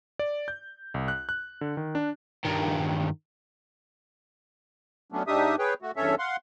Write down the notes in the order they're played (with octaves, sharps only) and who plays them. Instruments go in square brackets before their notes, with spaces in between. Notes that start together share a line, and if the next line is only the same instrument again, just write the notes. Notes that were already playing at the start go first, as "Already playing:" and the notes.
[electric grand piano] D5
G6
C2
F#6
F#6
D3
D#3
D4
[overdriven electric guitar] G2 D#3
[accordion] F#3 A3 B3 C#4 D4
G#2 D4 D#4 G4 E5 D#6
G#4 B4 C#5 G5
A3 F#4
E2 G2 C#4 A4 C#5 E5
F5 F#5 C6